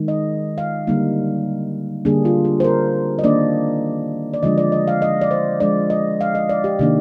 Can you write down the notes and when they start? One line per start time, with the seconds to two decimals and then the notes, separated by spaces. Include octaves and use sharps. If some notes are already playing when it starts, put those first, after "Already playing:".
Already playing: D#3 G#3 D#4
0.08 D#5
0.58 F5
0.87 D3 G3 A#3 D#4
2.05 D3 G3 A#3 D4 G#4
2.25 F4
2.45 G4
2.60 C5
2.64 A#4
3.19 D#5
3.24 D#3 A#3 D4 D5
4.34 D5
4.43 D3 F3 G#3 D4 D#5
4.58 D5
4.72 D#5
4.88 F5
5.02 D#5
5.21 D5
5.31 C5
5.60 F3 G#3 D4 D5
5.90 D#5
6.21 F5
6.35 D#5
6.49 D5
6.64 G4
6.79 C3 D#3 A#3 D4 G4